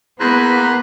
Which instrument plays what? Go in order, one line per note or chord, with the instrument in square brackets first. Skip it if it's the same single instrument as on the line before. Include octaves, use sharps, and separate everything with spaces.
[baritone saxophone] E2 [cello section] A#3 B3 [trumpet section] B4 [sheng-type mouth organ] A#5 C6 F#6